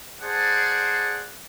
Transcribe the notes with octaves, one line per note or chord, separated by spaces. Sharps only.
G#4 C5 D5 F#5 A5